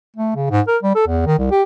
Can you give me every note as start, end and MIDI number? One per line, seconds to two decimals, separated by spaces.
0.17 0.33 57
0.36 0.49 49
0.50 0.61 44
0.68 0.78 70
0.83 0.94 55
0.95 1.07 69
1.08 1.25 40
1.26 1.36 51
1.39 1.46 36
1.51 1.63 67